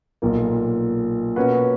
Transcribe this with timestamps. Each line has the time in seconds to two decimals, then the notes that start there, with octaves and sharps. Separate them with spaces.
0.22 B1 A#2 A#3
1.36 B2 A#3 C#4 F#4 B4